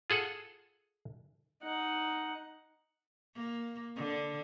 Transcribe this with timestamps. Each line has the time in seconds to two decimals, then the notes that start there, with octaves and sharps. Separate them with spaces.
0.10 F4 G#4 A4 F#5
1.63 D#4 F#5
3.35 A#3
3.96 D3